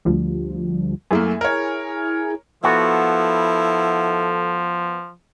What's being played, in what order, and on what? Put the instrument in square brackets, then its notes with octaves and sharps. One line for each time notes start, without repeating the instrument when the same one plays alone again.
[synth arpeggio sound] D2 F3 G3
[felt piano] F#2 A3 A#3 [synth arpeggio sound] E4 G#4 G#5
[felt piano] A#4 C#5
[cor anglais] F3 [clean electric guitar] B3 F#4 [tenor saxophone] E4 [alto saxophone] A4